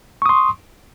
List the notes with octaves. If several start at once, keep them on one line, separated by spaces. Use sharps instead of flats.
C6 C#6 D#6